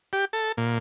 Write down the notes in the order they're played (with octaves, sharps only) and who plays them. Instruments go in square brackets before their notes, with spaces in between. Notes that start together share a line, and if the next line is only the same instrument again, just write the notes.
[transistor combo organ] G4
A4
A#2